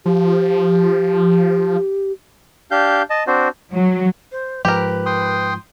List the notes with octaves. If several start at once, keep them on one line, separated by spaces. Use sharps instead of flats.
F3 G4
D4 G4 F5 G6
D#5 A5
C4 D4 F#4 C5
F#3
C5
G#2 F3 G4 A#4 B4
G5 C6 D#6